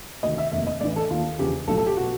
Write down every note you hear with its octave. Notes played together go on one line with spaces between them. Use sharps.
D2 C3 D#3 D#5
E5
F1 D#2 D#3 E5
D#5
A1 A2 E3 D5
A4
D#2 D#3 F4
E2 C#3 F3 G4
B1 A2 F3 A4
A4
G4
B2 F#4